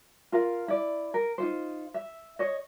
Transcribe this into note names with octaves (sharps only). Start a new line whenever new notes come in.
F4 A#4 F5
E4 D5
A#4
D#4 F4 C5
E5
C#5 D#5